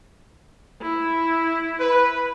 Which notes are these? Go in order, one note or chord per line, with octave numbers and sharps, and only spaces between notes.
E4
B4